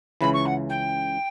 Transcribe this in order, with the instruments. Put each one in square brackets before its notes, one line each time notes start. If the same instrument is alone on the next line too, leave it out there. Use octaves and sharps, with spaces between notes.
[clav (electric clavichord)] C#2 C#3 E3 [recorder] B5
[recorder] C#6
F#5
G5